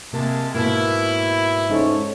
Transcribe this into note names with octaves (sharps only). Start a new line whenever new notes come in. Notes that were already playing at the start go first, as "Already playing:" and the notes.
C3 G#3 A#3 G4 A5
G#2 B2 A#3 E4
G#2 C#4 A4 C#5